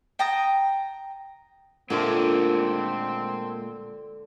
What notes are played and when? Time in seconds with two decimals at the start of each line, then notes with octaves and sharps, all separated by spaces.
0.19 G5 A5 A#5 D#6
1.90 A#2 D3 G#3 A3 C4 A#4